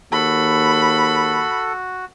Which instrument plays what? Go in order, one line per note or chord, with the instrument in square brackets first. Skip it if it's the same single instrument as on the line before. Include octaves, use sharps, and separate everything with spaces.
[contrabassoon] D#2 [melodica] F#4 [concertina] A4 [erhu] B5